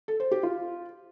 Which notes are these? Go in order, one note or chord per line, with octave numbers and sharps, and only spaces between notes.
A4
C5
G4
F4